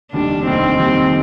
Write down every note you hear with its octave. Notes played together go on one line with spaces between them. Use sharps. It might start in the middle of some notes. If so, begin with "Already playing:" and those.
F1 D#2 D#3 G3 D4
F1 D#2 D#3 G3 C4
F1 D#2 D#3 G3